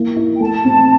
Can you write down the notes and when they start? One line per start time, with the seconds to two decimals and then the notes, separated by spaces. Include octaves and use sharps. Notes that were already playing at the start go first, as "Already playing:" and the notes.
Already playing: A#3 E4
0.16 E4
0.37 G5
0.40 A3 A5
0.65 C4